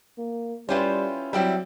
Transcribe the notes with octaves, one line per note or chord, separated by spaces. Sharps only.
A#3
G3 C#4 E4 F4 G4 B4 C5
F#3 G3 C4 E4 G4 E5